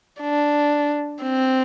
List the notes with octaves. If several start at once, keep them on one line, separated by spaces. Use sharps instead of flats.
D4
C4